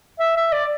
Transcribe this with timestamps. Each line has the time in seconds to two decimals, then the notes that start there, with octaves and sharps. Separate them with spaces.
0.19 E5
0.36 E5
0.52 D5